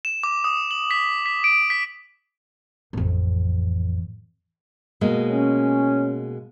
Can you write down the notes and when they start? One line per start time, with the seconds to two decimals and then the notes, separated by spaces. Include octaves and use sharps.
0.05 E7
0.23 D6
0.44 D#6
0.71 F#7
0.91 B6
1.26 B6
1.44 D7
1.70 B6
2.93 A1 F2
5.01 B2 G#3 A#3
5.30 C#4